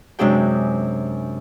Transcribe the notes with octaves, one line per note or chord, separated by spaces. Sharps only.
F#2 C3 G#3 D4 G#4 G5